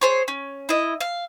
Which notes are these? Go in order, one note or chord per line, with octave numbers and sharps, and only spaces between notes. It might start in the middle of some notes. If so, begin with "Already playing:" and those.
G#4 C5 C#5
C#4
E4 D#5
F5